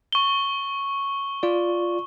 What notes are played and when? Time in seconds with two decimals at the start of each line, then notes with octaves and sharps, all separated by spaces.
0.13 C#6 G7
1.43 F4 D5